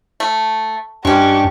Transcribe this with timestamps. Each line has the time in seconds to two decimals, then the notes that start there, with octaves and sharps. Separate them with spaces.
0.20 A3
1.05 G2 G#3 C#4 D4 G4 C#6